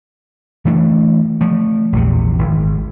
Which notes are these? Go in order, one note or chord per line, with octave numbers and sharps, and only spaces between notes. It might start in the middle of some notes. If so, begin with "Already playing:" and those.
E3 A3 D4
F3 A3
A#1 E2 C3
G#1